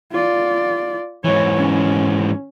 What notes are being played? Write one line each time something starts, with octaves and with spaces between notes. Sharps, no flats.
F4 D5
G#2 E3 C#5
C#4